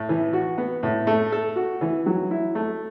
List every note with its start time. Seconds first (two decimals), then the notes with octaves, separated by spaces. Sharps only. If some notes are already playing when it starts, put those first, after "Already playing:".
Already playing: A2
0.09 E3
0.33 F#4
0.58 B3
0.83 A2
1.07 A3
1.32 A4
1.56 F#4
1.81 E3
2.06 F#3
2.31 E4
2.55 A3